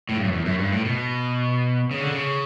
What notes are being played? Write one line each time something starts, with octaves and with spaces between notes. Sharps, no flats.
A2
G2
F#2
E2
F#2
G2
A2
B2
C#3
D3
C#3